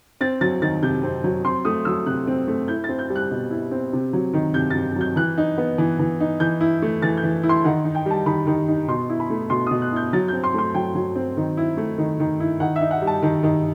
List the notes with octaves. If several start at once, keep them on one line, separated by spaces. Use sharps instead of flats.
C4 A6
F#3 A6
D#3 A6
C3 G6
C4
F#3
C4 C6
A3 D#6
F#3 E6
C3 F#6
C4
A3
E4 G6
C4 A6
G6
G3
F#6
B2
E4
C4
C3
F#3
D#3
C3 G6
C3 A6
F#3 G6
E3 F#6
D#4
B3
E3
E3
D#4
E3 G6
E4
A3
E3 A6
G6
E3
E4
C6
D#3 F#5
D#4
G5
G3
A5
D#3 B5
D#3
D#4
B2 C6
E4
B5
A3
B2 C6
B2 D#6
F#6
E4 G6
F#3 A6
C4 G6
C6
A3 C6
F#3 G5
F#3
C4
D#3
E4
A3
D#3
D#3
E4
D#3 F#5
E5
D#4
F#5
G3
A5
D#3
D#3